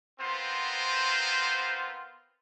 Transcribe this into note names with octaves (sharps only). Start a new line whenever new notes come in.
B3 C4 F4 A#4 C5